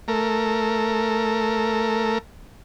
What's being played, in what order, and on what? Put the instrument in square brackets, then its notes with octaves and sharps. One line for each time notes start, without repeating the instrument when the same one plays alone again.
[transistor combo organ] A3 A#4